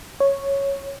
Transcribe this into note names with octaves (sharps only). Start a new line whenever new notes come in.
C#5